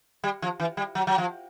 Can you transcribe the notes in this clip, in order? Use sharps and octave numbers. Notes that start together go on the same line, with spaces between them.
G3
F3
E3
G3
F#3
F#3
F3